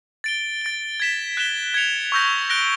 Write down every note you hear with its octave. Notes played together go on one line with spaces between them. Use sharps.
A6 D7 G7
A6 D7 G7
G#6 B6 E7
F#6 B6 E7 G7
G#6 C#7 F7
C#6 E6 G6 A#6
F#6 A#6 D7 G7